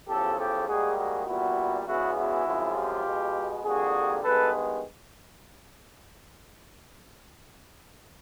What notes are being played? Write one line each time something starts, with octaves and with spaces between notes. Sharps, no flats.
E2 C#3 F3 G4 A4
G4 A4
G#2 D#3 G3 A#3 F#4 G#4
F#4 G#4
A#2 G3 B3 E4 F#4
E2 C#3 E3 G#3 B3 E4 F#4
E4 F#4
F#2 C#3 F3 G#3 C4
F4 G4
B2 G#3 B3
F2 D3 G3 A#3 F#4 G#4
G2 D#3 G#3 B3 A4 B4